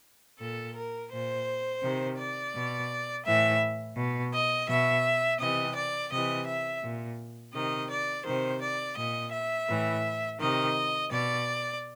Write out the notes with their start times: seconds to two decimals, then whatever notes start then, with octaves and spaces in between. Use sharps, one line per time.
0.40 A#2 A4
0.75 A#4
1.11 A#2 C5
1.82 C3 D#3
2.18 D5
2.54 B2
3.25 A2 E3 E5
3.97 B2
4.33 D#5
4.68 B2 E5
5.39 C3 E3 D#5
5.75 D5
6.11 C3 E3 D#5
6.46 E5
6.82 A#2
7.53 C3 D#3 D#5
7.90 D5
8.25 C3 D#3 C5
8.61 D5
8.96 A#2 D#5
9.32 E5
9.68 A2 E3
10.39 C3 D#3 D#5
11.11 B2 D5